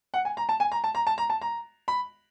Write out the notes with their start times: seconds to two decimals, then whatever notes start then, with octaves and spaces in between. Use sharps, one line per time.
0.14 F#5
0.25 G#5
0.37 A#5
0.49 A5
0.60 G#5
0.72 A#5
0.84 A5
0.95 A#5
1.07 A5
1.18 A#5
1.30 A5
1.41 A#5
1.88 B5